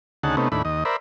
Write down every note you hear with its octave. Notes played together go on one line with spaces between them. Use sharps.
D2 C#3 D#4 G#4 F#5 A5
C3 A3 B3 C#4 D#4
D#2 A2 D4 E4 B5
D#2 D#5
A#4 C5 D5 E5 B5